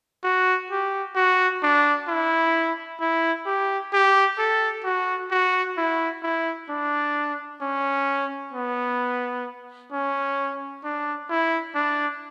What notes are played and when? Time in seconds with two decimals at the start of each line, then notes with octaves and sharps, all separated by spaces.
0.23 F#4
0.71 G4
1.16 F#4
1.63 D4
2.08 E4
3.00 E4
3.46 G4
3.93 G4
4.38 A4
4.84 F#4
5.31 F#4
5.77 E4
6.23 E4
6.69 D4
7.62 C#4
8.53 B3
9.92 C#4
10.84 D4
11.30 E4
11.75 D4